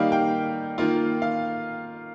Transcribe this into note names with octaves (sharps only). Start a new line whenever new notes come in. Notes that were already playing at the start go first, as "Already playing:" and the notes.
Already playing: D#3 G3 A#3 D#4 F5
G5
D#3 A#3 F4
F5